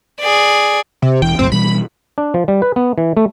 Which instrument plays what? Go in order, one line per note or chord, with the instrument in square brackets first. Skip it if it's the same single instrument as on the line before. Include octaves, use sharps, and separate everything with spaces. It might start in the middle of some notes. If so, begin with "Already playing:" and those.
[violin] G#4 D5
[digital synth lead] C3
[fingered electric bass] E1 E3 [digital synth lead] G5
[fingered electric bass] B1 F2 A2 [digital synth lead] C4
[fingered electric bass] B2 E3 G3 [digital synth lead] B5
[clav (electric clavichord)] D4
F3
G3
B4
B3
E3
A3